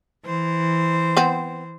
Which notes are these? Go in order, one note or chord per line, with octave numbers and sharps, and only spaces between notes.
E3 C5
B3 C4